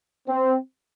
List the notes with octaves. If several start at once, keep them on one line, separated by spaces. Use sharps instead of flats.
C4